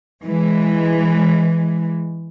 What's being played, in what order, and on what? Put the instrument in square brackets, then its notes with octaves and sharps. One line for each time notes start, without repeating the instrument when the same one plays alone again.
[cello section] E3 G#3